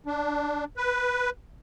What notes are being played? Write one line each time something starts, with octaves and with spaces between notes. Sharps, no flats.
D4
B4